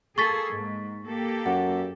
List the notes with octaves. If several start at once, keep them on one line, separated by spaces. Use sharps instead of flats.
A#3 G#4 A4 C#6 A6 B6
G#2
A#3 G4 A4
F#2 F#5